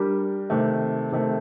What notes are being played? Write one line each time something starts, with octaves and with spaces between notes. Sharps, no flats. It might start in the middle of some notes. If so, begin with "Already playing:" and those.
Already playing: G3 D4 G4 A#4
C3 D#3 A3
C3 D#3 A3